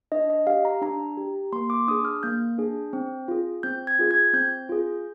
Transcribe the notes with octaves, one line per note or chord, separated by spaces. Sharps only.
D4 D#5
D#5
G4 F5
A#5
D4 A#5
G4
A#3 C6
D6
D4 G#4 D#6
F6
A#3 G6
D4 G#4
C4
F4 G#4
C4 G6
G#6
F4 G#4
G#6
C4 G6
F4 G#4